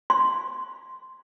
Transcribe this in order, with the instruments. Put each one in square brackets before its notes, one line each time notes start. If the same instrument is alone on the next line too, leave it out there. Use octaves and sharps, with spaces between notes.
[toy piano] C6